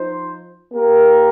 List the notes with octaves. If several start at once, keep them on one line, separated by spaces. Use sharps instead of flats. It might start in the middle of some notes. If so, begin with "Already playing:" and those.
Already playing: F3 D#4 C5
A#3 G4 A#4